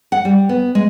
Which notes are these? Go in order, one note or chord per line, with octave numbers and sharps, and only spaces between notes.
F#5
G3
B3
G#3